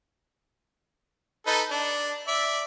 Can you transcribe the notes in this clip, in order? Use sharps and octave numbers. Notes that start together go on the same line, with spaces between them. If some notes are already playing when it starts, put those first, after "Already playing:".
D#4 A4 B4
D4
D5 E5